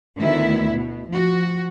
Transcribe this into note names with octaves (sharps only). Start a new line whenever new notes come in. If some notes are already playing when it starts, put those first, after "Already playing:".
D2 D#3 B3 E4 E5
B2
F3 F#4